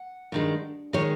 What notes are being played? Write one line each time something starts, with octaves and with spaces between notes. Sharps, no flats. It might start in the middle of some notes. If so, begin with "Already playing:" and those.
Already playing: F#5
G2 D#3 G#3
D#3 G#3 C#5